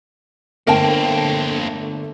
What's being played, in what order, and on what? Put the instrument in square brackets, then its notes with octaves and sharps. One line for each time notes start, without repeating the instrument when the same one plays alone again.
[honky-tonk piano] G1 A3 A5 [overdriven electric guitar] A#3 C4 [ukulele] A#4 G5